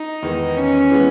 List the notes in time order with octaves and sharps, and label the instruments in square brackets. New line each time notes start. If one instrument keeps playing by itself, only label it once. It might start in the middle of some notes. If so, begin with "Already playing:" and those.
Already playing: [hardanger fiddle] D#4
[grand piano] E2 D#3 G#3
[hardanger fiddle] C#4
[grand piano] E3 G#3 B3